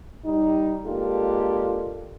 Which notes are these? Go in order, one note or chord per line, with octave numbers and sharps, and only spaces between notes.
G3 D#4
G#3 A#3 D4 F4 G4 A4